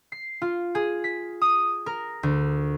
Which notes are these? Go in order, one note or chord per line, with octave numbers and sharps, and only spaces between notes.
C7
F4
G#4
B6
D#6
A#4
D2